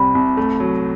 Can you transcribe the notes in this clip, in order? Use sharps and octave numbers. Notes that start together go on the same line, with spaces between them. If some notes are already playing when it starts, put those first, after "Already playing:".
Already playing: C2 C3 G3 B5
C2
A3
F#3